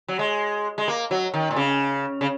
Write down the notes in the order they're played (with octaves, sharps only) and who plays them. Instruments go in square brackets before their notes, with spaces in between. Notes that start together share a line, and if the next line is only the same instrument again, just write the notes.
[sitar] F#3
G#3
G#3
A#3
F#3
D#3
A#2
C#3
C#3